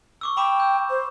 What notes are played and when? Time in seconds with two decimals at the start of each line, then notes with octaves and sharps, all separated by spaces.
0.21 C#6 D6 E6
0.37 G5 B5 D6 E7
0.60 E6 G6
0.90 C5